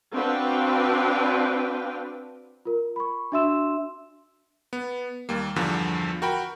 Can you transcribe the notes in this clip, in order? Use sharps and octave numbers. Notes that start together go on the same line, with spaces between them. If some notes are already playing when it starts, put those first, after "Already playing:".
C4 D4 F#4 B4 F5 G5
F4 A#4
B5 C#6
D4 F#4 E5 C6 E6 E7
B3
D#2 G3 A#3
E2 G2 D3 F3
F#4 A#4 G5 B5